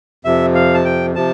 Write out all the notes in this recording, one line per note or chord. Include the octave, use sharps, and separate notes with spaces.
F2 C3 F3 E5
F5
A5
G5
C3 F3 A5